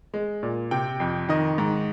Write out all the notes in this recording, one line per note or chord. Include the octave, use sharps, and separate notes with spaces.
G#3
A#2
C3 G5
F2
D#3 D#5
G#2